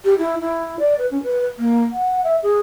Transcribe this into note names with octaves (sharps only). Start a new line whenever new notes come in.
G4
E4
E4
D5
B4
C#4
B4
A#3
F#5
E5
G#4